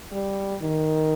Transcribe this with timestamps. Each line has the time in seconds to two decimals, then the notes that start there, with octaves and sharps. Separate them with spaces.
0.12 G3
0.62 D#3